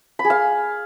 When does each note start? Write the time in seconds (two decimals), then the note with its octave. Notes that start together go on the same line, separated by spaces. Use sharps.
0.19 B5
0.25 G#4
0.30 F5